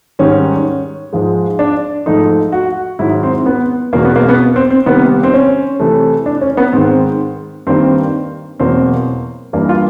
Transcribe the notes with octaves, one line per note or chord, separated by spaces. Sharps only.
G#2 D#3 G3 C#4
G#2 F3 G#3
D4
G#2 F3 A3 D#4
F#4
G#2 D#3 F#3 E4
C4
B3
E2 B2 G#3 A#3
B3
A#3
B3
C4
C4
C3 D#3 G3 A#3 B3
C4
C#4
C3 E3 A3
D4
C#4
B3
G#2 D#3 G#3 C4
G2 D#3 G3 A#3 C4
E2 B2 F#3 A#3 C4
G2 E3 G3 A#3
F4